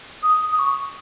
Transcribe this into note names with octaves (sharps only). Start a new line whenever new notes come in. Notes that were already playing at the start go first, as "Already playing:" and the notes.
D#6
D#6
C#6